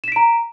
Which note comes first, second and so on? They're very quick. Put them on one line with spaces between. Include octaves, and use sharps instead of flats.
E7 B6 D7 A#5